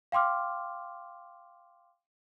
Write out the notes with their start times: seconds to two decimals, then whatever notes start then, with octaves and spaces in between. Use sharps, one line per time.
0.12 F5 G5 C6 D6 F6